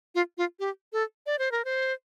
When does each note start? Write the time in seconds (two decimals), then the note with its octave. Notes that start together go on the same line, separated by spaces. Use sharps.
0.15 F4
0.38 F4
0.60 G4
0.93 A4
1.26 D5
1.39 C5
1.52 A#4
1.65 C5